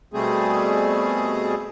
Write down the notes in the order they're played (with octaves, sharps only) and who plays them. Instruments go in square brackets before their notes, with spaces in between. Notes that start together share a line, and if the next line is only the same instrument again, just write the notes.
[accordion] B2 G3 A3 C4 G#4